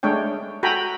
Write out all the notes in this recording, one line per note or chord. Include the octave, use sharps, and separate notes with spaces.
G#3 A3 D4 C#5 G5
F#4 A4 G5 G#5 A#5 B5